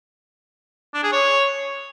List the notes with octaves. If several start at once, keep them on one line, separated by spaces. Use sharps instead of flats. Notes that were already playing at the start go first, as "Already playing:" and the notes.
D4
G#4
C#5